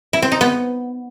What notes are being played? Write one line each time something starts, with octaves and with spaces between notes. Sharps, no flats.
E4
C4
D#4
B3